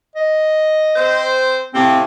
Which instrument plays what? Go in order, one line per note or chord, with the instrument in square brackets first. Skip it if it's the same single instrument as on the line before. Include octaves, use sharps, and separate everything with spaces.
[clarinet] D#5
[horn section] C4 C5
[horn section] A2 C3 F5 [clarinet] C4